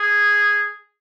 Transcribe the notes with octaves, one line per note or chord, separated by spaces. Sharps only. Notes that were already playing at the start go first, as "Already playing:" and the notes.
Already playing: G#4